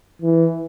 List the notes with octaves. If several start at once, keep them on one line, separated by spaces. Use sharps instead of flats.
E3